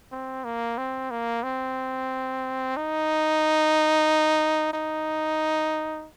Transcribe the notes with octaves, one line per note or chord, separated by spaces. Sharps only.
C4
A#3
C4
A#3
C4
D#4
D#4